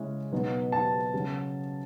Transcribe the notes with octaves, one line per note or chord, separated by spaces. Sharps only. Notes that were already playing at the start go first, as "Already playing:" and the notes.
Already playing: C#3 G#3 C#4 E4
B2 F#3 B3 D#4
A5
C#3 F#3 C#4